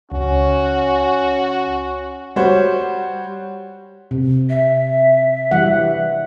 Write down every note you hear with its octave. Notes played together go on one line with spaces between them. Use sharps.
C#2 C#4 F#4
G3 F#4 C5 C#5 F#5
C3
E5
E3 G3 F#5